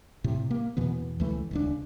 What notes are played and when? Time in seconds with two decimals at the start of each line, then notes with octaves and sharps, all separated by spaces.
0.24 A2 C3
0.51 A#3
0.77 E2 B2 E3 B3
1.20 C#2 E3 A3
1.51 D#1 C#2 D4